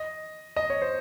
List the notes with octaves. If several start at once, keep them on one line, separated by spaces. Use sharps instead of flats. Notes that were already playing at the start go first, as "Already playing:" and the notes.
Already playing: D#5
D#5
C#5
C5